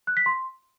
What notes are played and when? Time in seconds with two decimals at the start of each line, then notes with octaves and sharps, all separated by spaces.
0.07 F#6
0.17 B6
0.26 C6